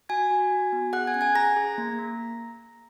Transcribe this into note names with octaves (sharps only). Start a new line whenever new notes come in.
F#4 G#5 G#6
F#4
F#4
B3
G#4 F#5 F#6
G#5 G#6
C#4 F#6
G#5 G#6
G#4 A#5 A#6
G#4
A#3
A#3